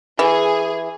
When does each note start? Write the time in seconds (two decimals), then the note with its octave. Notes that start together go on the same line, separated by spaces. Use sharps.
0.19 E3 G#4